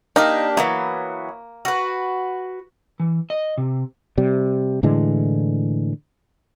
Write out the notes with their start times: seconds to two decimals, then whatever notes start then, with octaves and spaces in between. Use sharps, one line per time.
0.16 A#3 D4 D#4 G4
0.57 E3 F#3 A#3 B3
1.65 F#4 B4
3.00 E3
3.30 D#5
3.58 C3
4.18 C3 G3
4.83 A2 D3 E3 G#3